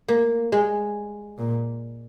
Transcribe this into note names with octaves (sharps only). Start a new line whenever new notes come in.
A#3
G#3
A#2